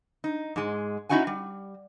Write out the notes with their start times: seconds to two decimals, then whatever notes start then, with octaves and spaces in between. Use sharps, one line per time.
0.24 D#4
0.56 G#2 G#3
1.09 C#4 D#4 E4 F#4 F#5 G#5
1.27 G3